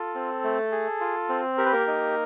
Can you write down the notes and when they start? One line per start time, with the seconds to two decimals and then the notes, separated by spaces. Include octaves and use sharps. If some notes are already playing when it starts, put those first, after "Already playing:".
Already playing: F4 A4
0.15 C4
0.44 A3
0.72 G#4
1.01 F4
1.29 C4
1.58 G4 A#4
1.66 B4
1.73 A#3 A#4
1.87 D#4